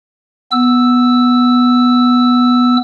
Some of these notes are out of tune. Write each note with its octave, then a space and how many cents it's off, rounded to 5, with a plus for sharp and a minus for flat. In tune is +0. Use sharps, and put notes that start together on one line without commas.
B3 +0 E6 -5